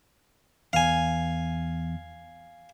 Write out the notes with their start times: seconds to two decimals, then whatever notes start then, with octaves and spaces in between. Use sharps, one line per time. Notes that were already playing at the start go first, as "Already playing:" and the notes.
0.73 E2 F5 G#5